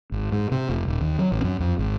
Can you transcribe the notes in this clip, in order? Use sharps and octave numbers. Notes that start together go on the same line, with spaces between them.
G#1
G#2
C3
F1
D#1
D#2
F#3
A1
F#2
F2
G#1